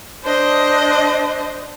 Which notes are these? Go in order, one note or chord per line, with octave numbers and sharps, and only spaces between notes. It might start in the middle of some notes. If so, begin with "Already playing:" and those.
D4 C5 D#5